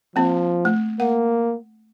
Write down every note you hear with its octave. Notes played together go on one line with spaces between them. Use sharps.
F3 A#3 C4
A3
A#3 F#5